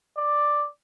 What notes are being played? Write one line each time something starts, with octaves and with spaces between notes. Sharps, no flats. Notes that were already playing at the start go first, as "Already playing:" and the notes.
D5